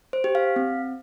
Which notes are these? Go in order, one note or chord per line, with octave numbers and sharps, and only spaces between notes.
C5
G4
F5
C4